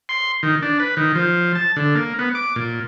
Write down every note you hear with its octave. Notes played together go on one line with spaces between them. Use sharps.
C6
D#3
D4
B4
D#3
F3
A5
D3
A#3
B3
D6
A#2